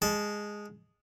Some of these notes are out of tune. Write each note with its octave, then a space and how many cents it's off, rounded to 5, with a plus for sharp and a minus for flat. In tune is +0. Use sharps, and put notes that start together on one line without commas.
G#3 -5 A5 -25